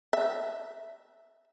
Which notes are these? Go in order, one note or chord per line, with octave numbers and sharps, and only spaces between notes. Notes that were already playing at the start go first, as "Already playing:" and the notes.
E5